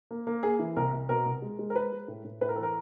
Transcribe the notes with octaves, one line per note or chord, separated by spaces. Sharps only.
A#3
A#3
A#3 G#4
E3
C2 A#4
C2
B2 A#4
C2
G#3
G#3
A#4
G#3 B4
G#3
A2
A2
A2 B4
A#4
E3 A4
A#4